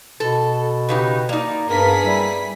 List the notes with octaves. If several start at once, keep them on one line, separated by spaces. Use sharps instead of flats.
B2 A4
C#3 D#4 G4 B4
A#3 D#4 D5
G2 B3 G#4 A#4 B6
G3 E4